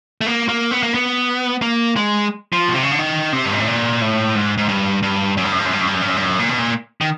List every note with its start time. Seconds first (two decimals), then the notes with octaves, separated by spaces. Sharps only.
0.21 A3
0.26 A#3
0.49 A#3
0.71 B3
0.83 A#3
0.94 B3
1.62 A#3
1.96 G#3
2.53 F3
2.68 B2
2.75 C3
2.83 C#3
2.92 D3
2.99 D#3
3.33 C3
3.45 G2
3.52 G#2
3.60 A2
3.67 A#2
4.01 A2
4.35 G#2
4.58 G#2
4.69 G2
5.03 G2
5.37 F#2
5.44 G2
5.52 F#2
5.59 G2
5.66 F#2
5.73 G2
5.81 F#2
5.87 G2
5.94 F#2
6.02 G2
6.08 F#2
6.16 G2
6.22 F#2
6.39 A#2
6.49 B2
6.59 A#2
7.01 D#3